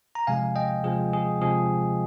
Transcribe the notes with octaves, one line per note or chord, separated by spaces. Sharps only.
A#5
C3 F3 G#3 F5 G#5
D#5 G5
C3 F3 G#3 G#4
G#4
C3 F3 G#3 G#4